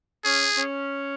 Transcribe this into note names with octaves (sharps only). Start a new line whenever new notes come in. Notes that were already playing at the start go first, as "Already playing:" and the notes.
C#4 G#4
C#4